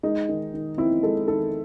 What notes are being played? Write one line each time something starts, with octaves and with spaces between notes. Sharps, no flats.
G#3 D#4
D#3
D#3
C4 E4
G#3 A4
D#3 A4